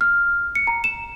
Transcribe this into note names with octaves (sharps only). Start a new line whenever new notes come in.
F6
C#7
A#5
E7